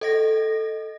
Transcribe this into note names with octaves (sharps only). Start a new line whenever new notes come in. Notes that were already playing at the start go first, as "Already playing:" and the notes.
A4 D#5 A#6